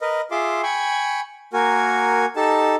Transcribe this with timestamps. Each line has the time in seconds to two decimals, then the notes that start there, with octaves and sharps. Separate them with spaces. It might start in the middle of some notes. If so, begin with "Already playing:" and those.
0.01 A#4 B4 D#5
0.31 F4 G#4 E5 C6 D6
0.63 G5 G#5 B5 C#6
1.53 A#3 F#4 A#4 G#5
2.36 D#4 G4 A4 A5